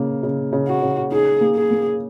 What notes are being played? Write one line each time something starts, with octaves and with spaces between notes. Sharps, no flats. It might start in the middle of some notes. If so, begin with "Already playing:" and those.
Already playing: C#3 A#3
C#3
C#3
F#4
C#3
D#4 G#4
A#3
G#4
A#3